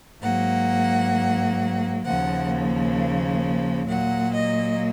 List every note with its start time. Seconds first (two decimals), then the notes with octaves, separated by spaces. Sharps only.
0.21 G#2 F#3 A#3 F#5
2.04 D#2 C#3 F3 A#3 F#5
3.88 A#2 F#3 A#3 F#5
4.33 D#5